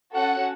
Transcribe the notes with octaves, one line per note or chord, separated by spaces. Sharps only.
C#4 F#4 A4 F#5